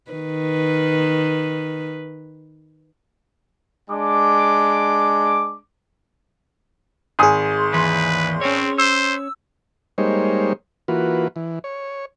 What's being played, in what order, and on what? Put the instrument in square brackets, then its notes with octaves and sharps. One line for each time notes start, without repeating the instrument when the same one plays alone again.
[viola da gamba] D#3 B4
[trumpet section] G#3 D4 D6
[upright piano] G#1 G#5 D#6 [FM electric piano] G#4 C6
[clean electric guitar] D#2 E3 [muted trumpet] B4
[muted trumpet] C4 [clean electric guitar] C#4 C#5
[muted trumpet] C5 [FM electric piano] E6
[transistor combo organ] G3 G#3 A#3 D#4 C5 C#5
E3 A#3 F4 F#4 B4
E3
C#5